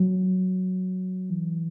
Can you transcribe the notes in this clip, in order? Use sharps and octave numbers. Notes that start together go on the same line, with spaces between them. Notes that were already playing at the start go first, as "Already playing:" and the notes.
Already playing: F#3
E3